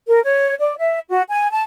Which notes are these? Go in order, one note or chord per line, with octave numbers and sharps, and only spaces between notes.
A#4
C#5
D5
E5
F#4
G#5
A5